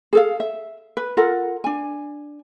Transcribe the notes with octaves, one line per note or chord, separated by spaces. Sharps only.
G#4 A4 F5
E5
B4
F4 A4 A#4 F#5
D4 G#5